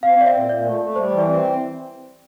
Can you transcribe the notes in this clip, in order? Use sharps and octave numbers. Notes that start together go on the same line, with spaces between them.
C4 F5
C4 D5
E5
A#2
A#2 D5
A3
A3
G3 C5
E3
D5
C4